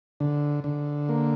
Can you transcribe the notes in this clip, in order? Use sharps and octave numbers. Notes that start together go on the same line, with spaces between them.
D3
D3
A#3